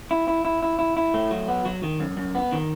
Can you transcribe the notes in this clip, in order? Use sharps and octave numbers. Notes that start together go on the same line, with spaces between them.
E4
E4
E4
E4
E4
E4
A3
F#3
B3
F#3
D#3
F#2
F#2
B3
D#3